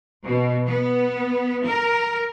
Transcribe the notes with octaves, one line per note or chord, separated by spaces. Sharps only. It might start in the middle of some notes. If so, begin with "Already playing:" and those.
B2
B3
A#4